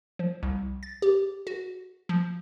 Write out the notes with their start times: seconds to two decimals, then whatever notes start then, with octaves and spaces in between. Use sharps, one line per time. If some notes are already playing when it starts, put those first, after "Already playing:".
0.19 F3
0.43 C2
0.83 A6
1.02 G4
1.47 F#4
2.09 F3